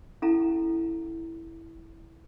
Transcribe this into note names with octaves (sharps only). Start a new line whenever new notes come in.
C#4 E4 A4 F5 A#5